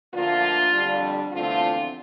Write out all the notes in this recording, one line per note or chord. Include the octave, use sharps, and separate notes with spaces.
D2 D3 F3 A#3 F4
F2 D3 G3 D4
E2 D3 F3 A3 C4 F4